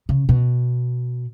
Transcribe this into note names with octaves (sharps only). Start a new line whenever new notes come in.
C#3
B2